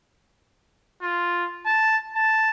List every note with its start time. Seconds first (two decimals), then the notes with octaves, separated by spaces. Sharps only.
1.02 F4
1.66 A5
2.15 A5